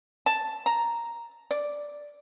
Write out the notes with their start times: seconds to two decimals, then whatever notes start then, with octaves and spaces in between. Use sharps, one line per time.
0.26 A5
0.66 A#5
1.51 D5